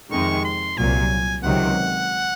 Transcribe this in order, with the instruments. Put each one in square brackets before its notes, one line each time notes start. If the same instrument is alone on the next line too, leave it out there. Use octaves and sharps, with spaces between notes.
[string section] F2 C3 D#3 G#3 [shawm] C#6
[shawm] C6
[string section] C2 A#2 F#3 [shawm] G#5
[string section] C#2 C3 D#3 F#3 [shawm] F#5